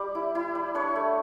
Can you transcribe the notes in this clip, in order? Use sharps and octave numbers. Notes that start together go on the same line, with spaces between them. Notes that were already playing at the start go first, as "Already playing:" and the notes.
Already playing: G3 D5 D6
E4
E4
G3
D4 C#5 C#6
A3